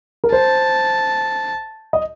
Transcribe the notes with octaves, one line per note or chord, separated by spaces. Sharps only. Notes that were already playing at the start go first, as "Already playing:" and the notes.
A#4
C5 A5
D#5